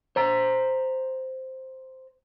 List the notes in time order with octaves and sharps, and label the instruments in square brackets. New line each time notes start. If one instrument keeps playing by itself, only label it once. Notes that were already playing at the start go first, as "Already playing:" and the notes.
[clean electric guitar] C5 A#5